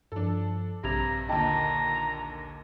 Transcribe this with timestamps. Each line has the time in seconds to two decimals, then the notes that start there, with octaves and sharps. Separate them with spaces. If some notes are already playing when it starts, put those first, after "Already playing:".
0.12 G2 F3 D4 A4
0.83 A#1 G2 C3 G4 A#5 G#6 F7
1.29 D#2 A#2 D3 D#5 G5 A5 A#5